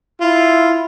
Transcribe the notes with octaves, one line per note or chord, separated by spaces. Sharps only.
E4 F4